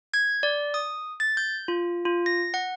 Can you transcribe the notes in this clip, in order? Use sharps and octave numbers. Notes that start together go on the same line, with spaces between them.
G#6
D5
D#6
A6
G6
F4
F4
A#6
F#5